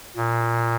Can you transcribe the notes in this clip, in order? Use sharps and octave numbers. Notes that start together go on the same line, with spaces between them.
A#2